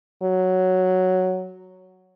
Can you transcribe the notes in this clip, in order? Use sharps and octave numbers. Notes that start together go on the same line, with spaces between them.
F#3